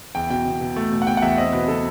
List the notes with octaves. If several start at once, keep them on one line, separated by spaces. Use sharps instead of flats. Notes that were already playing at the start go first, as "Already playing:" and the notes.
E2 G5
B2 G5
B2
B2
A3
B2
F#5
B2 G5
F#5
E2 E5
C4 D#5
B2 B4
B2 A4